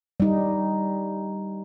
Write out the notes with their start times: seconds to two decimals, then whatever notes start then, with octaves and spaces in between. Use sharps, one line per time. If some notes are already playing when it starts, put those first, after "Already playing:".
0.20 G3 D#4